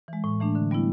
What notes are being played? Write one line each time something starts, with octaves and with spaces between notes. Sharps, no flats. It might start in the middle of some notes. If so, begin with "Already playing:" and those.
E3 G#3
A2
E3 A3 D4
D3
G3 B3 E4